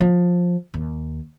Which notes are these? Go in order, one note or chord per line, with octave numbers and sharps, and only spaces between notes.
F3
D#2